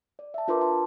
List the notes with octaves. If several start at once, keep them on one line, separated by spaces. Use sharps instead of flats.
D5
E5 A5
D4 F4 A#4 B4 C6 D6
A5 C6